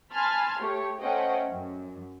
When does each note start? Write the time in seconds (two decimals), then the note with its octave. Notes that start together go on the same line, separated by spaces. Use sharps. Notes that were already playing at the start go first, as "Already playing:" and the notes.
0.12 G#5 A5 B5 C6 F6 G#6
0.60 A3 G4 C#5
1.00 A3 C#4 C5 D#5 F#5 G5
1.50 F#2